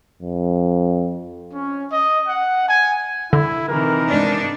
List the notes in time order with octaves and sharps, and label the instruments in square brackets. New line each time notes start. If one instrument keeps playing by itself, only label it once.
[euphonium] F2
[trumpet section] C#4
D#5
F#5
G#5
[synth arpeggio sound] D3 [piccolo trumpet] E4
[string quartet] C3 D#3 E3 [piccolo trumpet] A#4
[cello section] G#2 D4 D#4